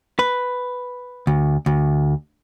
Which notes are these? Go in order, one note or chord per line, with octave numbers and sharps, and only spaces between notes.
B4
D2
D2